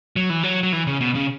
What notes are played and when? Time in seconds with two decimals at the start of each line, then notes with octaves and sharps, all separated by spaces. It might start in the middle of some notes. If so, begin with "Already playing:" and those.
0.16 F#3
0.30 E3
0.43 F#3
0.63 F#3
0.73 E3
0.87 C#3
1.01 B2
1.15 C#3